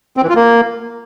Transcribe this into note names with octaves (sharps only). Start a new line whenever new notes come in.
C4
E3
F4
A#3